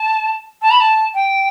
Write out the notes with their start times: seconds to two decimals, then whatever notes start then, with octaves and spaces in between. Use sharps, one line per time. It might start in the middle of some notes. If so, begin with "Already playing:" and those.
Already playing: A5
0.62 A5
0.71 B5
0.80 A5
1.14 G5